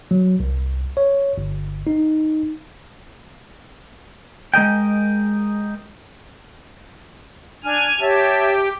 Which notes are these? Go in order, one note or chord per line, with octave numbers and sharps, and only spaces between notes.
F#3
C2
C#5
G1
D#4
G#3 A#4 D#5 G5
D4 G#5 F6
G4 C#5 E5 A5